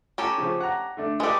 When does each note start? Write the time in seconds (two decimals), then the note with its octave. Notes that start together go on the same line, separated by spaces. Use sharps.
0.18 C#4 G4 A4 A#5
0.38 C#3 F3
0.60 F#5 A#5
0.97 D3 A3 D4
1.20 G#3 G4 A4 B4 D5